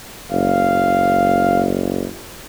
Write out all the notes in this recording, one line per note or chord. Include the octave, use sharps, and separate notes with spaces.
F#1 F5